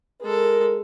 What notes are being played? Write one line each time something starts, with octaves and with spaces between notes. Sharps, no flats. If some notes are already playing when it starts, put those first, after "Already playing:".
G#3 A4 A#4